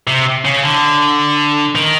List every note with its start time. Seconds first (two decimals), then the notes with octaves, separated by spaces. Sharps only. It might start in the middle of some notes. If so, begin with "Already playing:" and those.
0.07 C3
0.45 C#3
0.63 D3
1.75 D#3